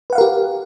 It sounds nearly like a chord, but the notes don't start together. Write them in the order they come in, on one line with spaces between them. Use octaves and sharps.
B4 F#5 F5 A#4 G4